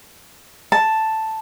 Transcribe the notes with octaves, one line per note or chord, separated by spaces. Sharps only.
A5